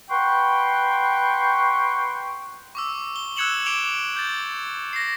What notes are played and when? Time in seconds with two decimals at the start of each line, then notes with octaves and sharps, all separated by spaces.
0.10 B4 F#5 G5 C6 C#6
2.75 C#6 D6 E6
3.16 G7
3.37 E6 F#6 G#6 C#7 E7 F#7
3.66 D6 D7 E7 F7 G7
4.14 D6 G6 A6
4.93 A#6 C7